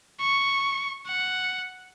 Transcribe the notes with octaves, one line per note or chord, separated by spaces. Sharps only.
C#6
F#5